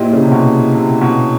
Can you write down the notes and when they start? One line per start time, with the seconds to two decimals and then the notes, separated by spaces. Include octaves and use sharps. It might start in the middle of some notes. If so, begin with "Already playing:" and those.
Already playing: A#2 E4 G4 C5 D#5
0.13 C#3
0.23 C3
0.32 B2
0.74 C3
1.02 B2